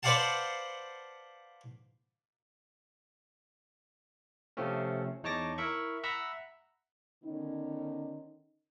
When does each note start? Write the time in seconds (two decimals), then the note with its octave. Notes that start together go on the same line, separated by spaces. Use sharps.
0.03 B4 C5 D5 F5 F#5 A5
4.57 C3 F3 A3 C4 C#4
5.23 E2 D#4 C#5 A5 D6 A#6
5.58 E4 A#4 E5 B5 C#6
6.04 E5 F#5 A#5 B5 E6
7.24 D3 D#3 B3 C#4 D#4